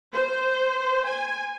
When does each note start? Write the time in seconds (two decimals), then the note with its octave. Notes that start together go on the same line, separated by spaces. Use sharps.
0.14 C5
1.07 G#5